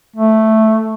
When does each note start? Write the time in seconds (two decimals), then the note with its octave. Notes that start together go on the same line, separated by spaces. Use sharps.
0.16 A3